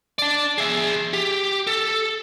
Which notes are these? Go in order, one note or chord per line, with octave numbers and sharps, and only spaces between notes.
D5 A5
G#4 E5
G4
A4